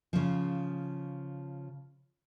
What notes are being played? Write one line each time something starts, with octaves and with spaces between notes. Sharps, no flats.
C#3 F3